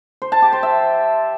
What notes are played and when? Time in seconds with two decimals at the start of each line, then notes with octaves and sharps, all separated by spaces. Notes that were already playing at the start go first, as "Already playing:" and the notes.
0.22 C5
0.32 A5
0.42 G4
0.53 C5
0.63 E5